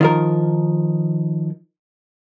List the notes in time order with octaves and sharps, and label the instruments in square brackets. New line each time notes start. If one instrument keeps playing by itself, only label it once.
[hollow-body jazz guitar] D#3 F3 A#4